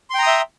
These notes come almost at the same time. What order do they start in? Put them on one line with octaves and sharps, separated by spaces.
C6 G5 A#5 D#6 E5